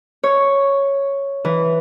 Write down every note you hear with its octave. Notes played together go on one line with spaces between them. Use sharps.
C#5
E3